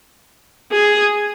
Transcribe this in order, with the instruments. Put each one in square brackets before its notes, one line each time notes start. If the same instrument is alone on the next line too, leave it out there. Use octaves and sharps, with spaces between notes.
[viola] G#4